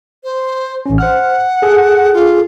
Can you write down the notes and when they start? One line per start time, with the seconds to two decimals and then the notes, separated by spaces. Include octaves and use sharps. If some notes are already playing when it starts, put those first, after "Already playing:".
0.24 C5
0.86 A1 C#4
0.98 C5 F#5 F6
1.62 G#4 A4
2.13 F4